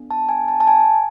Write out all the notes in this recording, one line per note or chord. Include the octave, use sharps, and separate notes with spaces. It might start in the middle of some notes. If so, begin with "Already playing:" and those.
Already playing: B3 D4 A4
A5
G#5
A5
A5
G#5